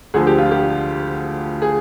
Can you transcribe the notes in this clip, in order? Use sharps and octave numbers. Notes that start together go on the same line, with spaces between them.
D2 D3 F3 G#4
G4
F4
G4
G#4